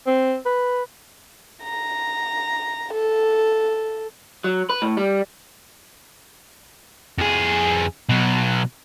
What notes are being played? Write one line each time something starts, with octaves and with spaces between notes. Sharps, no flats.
C4
B4
A#5
A4
F#3
B4
A2
G3
F2 G#4
B2 F#3